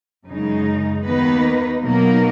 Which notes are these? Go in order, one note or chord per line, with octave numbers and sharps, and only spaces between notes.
F#2 C#3 G#3 D#4
D#2 D#3 A#3 B3 D#4 B4
B2 F#3 A#3 B3 D#4 A#4